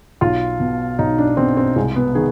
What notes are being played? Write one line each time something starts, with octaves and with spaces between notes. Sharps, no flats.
B1 F4
B2
B1 D#4
D4
B2 C4
C4
C2 G#3
B3
D#3 G#4